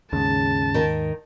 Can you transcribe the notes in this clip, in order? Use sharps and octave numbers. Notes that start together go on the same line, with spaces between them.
D#2 G#2 C#3 A5
D#3 A#4